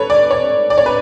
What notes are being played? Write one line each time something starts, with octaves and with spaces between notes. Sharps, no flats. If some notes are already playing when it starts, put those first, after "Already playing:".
Already playing: A4 B4 C#5
D5
C#5
D5
C#5
B4